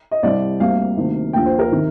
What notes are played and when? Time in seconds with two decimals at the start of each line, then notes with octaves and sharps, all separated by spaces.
0.11 D#5
0.23 C2 C3 G3 C4 D5
0.60 D2 C3 G3 A#3 F5
0.97 D2 C3 D#3 A#3
1.33 D#2 D3 F3 G5
1.46 C5
1.59 A#4
1.72 C3 D#3